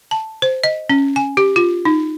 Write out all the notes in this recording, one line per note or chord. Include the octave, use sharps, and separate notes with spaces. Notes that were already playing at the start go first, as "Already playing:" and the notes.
A5
C5
D#5
C#4
G#5
G4
F4
D#4